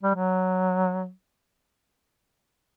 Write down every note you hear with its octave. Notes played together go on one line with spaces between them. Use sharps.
G3
F#3